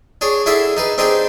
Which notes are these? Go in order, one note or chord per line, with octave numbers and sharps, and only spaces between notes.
D4 G#4 C#5
D4 E4 G#4 A4 E5 F#5
D#4 G#4 B4
C4 D4 D#4 G4 G#4